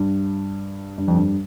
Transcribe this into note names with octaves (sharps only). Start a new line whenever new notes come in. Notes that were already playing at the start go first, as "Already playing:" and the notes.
Already playing: G2
G2
F2
G2